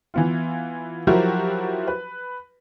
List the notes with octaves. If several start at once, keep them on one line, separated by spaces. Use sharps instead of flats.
E3 B3 F4
F3 F#3 E4 F#4 G4 A#4
B4